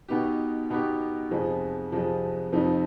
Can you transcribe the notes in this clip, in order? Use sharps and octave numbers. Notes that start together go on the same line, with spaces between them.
B2 B3 D#4 G4
B2 B3 D#4 G4
F2 C3 F3 G#3
F2 C3 F3 G#3
F2 C3 F3 C4 D#4